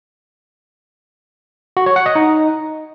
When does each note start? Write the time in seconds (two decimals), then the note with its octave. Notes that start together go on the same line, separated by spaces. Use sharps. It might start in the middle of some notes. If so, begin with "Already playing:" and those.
1.77 F#4
1.86 C#5
1.96 F#5
2.06 D#5
2.16 D#4